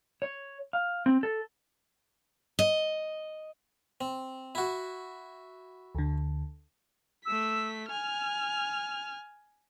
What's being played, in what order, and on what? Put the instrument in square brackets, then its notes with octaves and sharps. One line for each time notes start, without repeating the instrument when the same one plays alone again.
[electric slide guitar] C#5
F5
C4
A4
[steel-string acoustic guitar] D#5
[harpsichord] C4
E4 F#4
[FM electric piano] D2 D3
[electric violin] A3 B6 [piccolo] E6
[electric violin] G#5 F6 [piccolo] F7